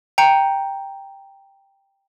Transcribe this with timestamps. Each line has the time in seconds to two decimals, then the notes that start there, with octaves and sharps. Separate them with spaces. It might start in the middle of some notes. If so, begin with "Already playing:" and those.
0.18 G5 A#5 G6 C#7